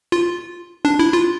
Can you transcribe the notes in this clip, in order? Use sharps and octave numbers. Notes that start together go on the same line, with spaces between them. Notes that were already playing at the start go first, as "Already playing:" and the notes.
F4
D4
E4
F4